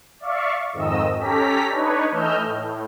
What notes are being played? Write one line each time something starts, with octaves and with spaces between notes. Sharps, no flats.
D5 E5 F5 C#6
F2 G#2 D#3 D#5 E6
C#4 G4 A4 A#5 B6
D4 D#4 B4 C#5
E3 A3 D#5 E6 F6 G6
A2